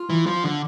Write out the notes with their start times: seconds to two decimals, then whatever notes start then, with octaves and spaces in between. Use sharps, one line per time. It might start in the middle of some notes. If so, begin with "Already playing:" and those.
Already playing: F4
0.10 E3
0.26 F3
0.43 D3